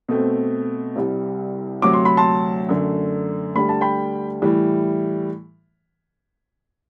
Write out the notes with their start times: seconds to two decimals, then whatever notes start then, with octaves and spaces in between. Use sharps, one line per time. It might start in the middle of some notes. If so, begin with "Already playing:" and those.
0.09 B2 A3 C4
0.96 C2 C3 G3
1.82 D2 C3 F#3 D6
1.93 C6
2.05 B5
2.17 A5 C6
2.69 F#2 D3 A3
3.55 D2 D3 G3 B5
3.69 A5
3.81 G5 B5
4.42 A2 E3 G3